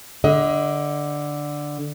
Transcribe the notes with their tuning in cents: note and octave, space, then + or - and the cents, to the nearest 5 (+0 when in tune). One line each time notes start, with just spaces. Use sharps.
D3 +0 D#5 +30